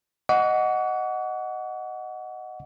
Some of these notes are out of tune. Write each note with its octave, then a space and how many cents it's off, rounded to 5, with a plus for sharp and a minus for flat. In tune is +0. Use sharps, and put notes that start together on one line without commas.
D#5 +0 F#5 +0 C#6 +45